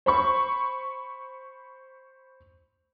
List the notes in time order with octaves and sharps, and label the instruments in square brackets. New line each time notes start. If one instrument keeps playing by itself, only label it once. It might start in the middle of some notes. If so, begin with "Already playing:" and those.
[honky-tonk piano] C5 B5 C#6